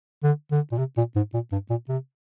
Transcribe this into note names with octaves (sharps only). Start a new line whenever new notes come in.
D3
D3
A#2
C3
A#2
G#2
A#2
G2
A#2
C3